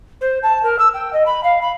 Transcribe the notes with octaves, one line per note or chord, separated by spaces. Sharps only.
C5
A5
A#4
E6
G5
D#5
B5
F5
B5